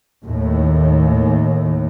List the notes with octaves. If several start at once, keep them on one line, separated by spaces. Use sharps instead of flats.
D#2 A2